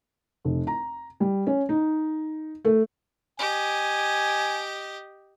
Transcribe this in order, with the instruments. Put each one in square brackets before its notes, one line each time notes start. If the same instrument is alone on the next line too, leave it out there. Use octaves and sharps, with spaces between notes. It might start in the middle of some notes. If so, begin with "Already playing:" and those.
[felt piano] F1
A#5
G3
C#4
D#4
A3
[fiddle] G4 D#5 [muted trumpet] G#5